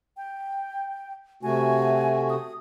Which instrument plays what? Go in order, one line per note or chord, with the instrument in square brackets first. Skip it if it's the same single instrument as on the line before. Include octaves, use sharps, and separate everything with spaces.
[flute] G5
[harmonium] C3 A3 F#4 [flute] G#5
[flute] D#6